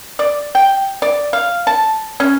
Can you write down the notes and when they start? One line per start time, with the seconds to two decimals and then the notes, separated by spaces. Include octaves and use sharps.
0.19 D5
0.55 G5
1.02 D5
1.33 F5
1.67 A5
2.20 C#4